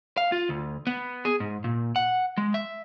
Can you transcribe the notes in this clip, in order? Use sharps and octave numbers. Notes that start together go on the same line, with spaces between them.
F5
F4
D2
B3
G#4
G#2
A#2
F#5
G#3
E5